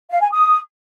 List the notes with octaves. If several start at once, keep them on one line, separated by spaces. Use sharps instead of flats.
F5
G#5
D#6